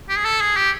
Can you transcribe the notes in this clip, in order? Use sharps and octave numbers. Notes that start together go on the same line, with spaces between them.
G4
G#4
A4
G#4
G4